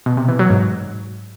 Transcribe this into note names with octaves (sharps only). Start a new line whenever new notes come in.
B2
C3
E3
F#3
G#2